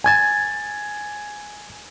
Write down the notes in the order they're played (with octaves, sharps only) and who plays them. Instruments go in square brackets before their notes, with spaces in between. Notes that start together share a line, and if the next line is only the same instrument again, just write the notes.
[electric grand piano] G#5 G#6 A6